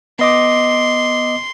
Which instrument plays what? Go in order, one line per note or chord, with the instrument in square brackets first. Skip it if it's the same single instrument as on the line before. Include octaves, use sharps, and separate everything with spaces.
[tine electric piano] B3 D#5 D6 [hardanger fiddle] C6